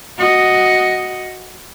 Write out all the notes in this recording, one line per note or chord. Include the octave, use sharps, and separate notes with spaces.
F#4 D#5